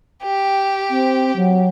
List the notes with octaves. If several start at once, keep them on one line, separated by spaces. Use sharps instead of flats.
G4
C4
F#3